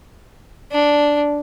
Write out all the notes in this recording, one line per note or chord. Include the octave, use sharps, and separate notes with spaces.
D4